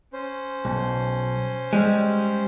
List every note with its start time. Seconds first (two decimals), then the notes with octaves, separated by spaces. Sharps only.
0.13 C#4 C5
0.65 B1
1.73 G3 G#3